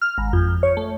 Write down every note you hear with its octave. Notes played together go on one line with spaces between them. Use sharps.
F6
G#1
F2
C#5
A3